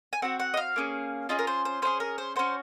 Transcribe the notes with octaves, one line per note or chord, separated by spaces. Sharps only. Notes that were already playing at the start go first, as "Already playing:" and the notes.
G#5
C4 F#4 F#5
F#5
D#5
F5
A#3 C#4 G#4
C#4 F4 G#4 D#5
A#4
C5
C5
C#4 F4 G#4 C5
A#4
C5
C#4 F#4 C5